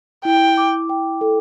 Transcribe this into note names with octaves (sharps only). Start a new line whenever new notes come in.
E4 G5
D6
G5
A4